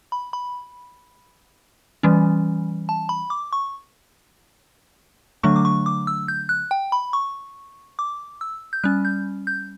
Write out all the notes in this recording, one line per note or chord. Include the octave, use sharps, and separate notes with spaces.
B5
B5
E3 G3 C#4
A5
B5
D6
C#6
D3 F#3 A3 D4 C#6
D6
C#6
D6
E6
G6
F#6
G5
B5
C#6
D6
E6
G6
G3 C#4 F#6
G6
G6